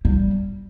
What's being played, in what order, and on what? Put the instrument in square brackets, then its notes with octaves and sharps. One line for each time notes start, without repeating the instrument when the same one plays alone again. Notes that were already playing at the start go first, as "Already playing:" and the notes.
[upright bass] G3